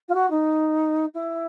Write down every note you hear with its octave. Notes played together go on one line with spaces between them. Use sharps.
F4
F#4
D#4
E4